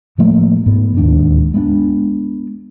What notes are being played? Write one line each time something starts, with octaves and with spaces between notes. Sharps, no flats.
A2 F3 A3 A#3
G#2 B3
D1 D#2 G#2 D4
G#3 B3 C#4 D4